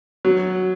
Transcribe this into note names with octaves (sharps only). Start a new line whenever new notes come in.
F#3